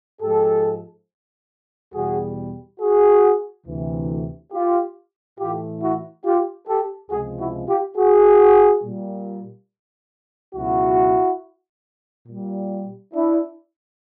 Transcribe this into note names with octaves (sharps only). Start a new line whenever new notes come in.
G#2 F3 G#3 G4 A4
E2 B2 G3 F#4 G#4
F#4 G#4
D2 C3 E3
F4 G4
A2 E3 A3 F4 G4
E4 F#4
F4 G4
G4 A4
C#2 C3 F3 G#3 F#4 G#4
E4 F#4
F4 G4
F#4 G#4
A#2 G3
C#2 B2 F#3 E4 F#4
A#2 G3
D4 E4